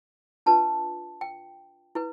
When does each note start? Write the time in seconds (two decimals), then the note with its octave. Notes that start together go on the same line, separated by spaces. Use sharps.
0.46 D4 F4 B4 A5
1.21 G5
1.95 E4 B4